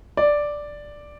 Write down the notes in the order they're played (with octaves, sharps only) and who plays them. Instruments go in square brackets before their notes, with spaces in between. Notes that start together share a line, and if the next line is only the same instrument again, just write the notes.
[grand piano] D5